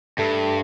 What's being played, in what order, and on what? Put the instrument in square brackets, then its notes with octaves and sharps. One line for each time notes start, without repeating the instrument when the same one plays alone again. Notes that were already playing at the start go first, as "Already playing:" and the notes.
[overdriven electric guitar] G2 [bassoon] A3